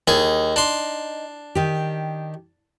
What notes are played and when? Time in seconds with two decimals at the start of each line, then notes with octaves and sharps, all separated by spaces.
0.08 D#2 D#4 G#4
0.56 D4 C6
1.55 D#3 G4